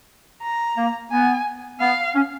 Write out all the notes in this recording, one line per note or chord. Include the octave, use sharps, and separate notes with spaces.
A#5
A#3
B3 G#5
B3 F5
C#4